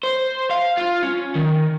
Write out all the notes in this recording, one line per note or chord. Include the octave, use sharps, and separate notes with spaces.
C5
F5
F4
C#4
D#3